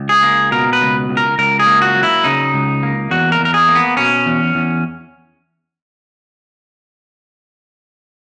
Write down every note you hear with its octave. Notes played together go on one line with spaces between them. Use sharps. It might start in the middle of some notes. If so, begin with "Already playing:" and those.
Already playing: C#2
G#4
A#3
B2 A#4
B4
C#2
C#2
A#4
C#2 A#4
G#4
A#3
F#4
F#3
E4
C#3 D#4
C#2
A#3
E2 F#4
A#4
E2
A#4
G#4
A#3
B3
B2 C#4
E2
E2